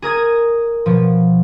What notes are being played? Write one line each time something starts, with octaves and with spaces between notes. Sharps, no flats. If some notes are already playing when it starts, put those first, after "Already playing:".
G#4 A#4 D#6 G#6
B2 F3